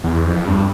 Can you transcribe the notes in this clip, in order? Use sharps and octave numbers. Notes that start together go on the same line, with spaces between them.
E2
F2
G2